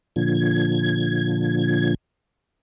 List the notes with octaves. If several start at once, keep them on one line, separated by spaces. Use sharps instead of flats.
A#2 D3 F3 G#6